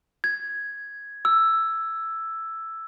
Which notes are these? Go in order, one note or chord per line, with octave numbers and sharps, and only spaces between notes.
G#6
E6